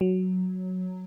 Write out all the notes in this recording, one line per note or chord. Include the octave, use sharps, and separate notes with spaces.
F#3